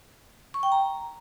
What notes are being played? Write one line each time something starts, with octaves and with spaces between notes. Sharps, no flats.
C#6
G5
A#5